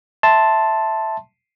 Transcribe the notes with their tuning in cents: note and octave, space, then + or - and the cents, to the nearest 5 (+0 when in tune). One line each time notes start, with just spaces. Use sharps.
E5 -5 A5 +0 C6 +0